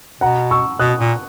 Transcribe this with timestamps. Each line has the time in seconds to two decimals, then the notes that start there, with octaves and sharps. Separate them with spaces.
0.21 B2 F#5 A#5
0.51 C#6 E6
0.79 B2 D#6 F#6
0.99 A#2